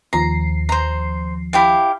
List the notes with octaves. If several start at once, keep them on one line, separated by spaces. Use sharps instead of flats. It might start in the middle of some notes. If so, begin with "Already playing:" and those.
D#2 F3 A#5 C7
C5 A#5
E4 G4 F5